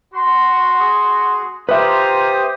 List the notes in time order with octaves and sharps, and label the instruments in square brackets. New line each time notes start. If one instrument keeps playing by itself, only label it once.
[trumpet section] F#4 C6
[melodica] G#4
[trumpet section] F4 A#5 [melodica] G4 C5 D#6 [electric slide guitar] B4 E5